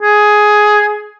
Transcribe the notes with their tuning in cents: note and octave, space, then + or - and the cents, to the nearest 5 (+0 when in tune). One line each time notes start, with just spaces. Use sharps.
G#4 +10